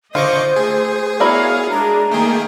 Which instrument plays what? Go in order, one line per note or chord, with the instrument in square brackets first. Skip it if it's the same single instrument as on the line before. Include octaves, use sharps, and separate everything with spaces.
[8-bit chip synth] D3 C#6 D6 [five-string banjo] F4 [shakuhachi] C5 [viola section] D#5
[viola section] A3 [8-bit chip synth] G#4
[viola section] B3 C#5 F5 [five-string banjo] E4 A#4 D5 [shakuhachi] F#4
[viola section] G#3 D4 G#4 [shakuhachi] A#5
[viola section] D#3 A#3 G5 [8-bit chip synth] A3 G#4